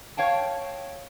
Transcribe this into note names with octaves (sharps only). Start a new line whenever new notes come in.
C#5 F5 G5 A5